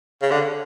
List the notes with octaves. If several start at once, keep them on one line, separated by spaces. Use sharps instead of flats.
C#3
D3